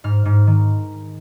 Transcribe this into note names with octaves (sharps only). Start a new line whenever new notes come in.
G#2 F6
G#2
D#3